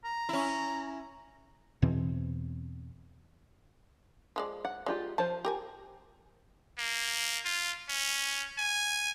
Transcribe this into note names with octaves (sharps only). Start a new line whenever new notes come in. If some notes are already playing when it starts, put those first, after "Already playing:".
A#5
C#4 E4
E2 B2 E3 C4
F3 G#3 D5
F#5
G#3 F4 G4 D5
F3 C5 A5
G4 A#4 G#5
A#3
F4
C#4
G#5